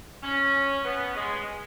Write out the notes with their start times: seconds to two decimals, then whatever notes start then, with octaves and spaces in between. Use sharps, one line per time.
0.23 C#4
0.85 B3
1.16 G#3